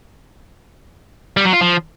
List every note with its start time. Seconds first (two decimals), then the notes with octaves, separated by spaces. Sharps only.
1.37 G3
1.45 F#3
1.53 F4
1.61 F3